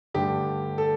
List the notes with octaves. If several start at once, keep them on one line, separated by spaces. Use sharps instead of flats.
G2 D3 A3 G4
A4